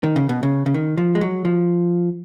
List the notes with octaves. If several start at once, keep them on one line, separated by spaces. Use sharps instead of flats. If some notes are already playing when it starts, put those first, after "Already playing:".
D#3
C#3
B2
C#3
C#3
D#3
F3
G#3
F#3
F3